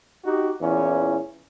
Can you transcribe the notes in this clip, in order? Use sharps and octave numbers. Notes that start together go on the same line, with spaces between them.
D#4 F#4 G4
E2 A#2 E3 C#4